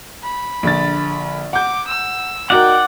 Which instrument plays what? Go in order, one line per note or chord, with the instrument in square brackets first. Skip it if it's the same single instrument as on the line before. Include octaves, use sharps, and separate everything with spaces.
[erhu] B5
[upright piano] A#1 D3 A6
[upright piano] F#5 G6 [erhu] D6
[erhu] E6
[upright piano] D#4 F#4 A#4 [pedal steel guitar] D5 F#5 [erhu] G5